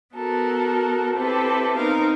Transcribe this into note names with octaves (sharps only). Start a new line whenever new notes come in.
B3 F#4 A4 A#4
C4 E4 G4 A4 B4
B3 C4 D#4 A#4 F5